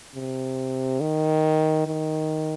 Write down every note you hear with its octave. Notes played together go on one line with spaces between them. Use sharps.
C3
D#3
D#3